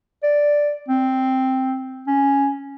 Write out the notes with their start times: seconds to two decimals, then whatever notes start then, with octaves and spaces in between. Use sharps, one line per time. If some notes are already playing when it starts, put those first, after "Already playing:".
0.23 D5
0.88 C4
2.07 C#4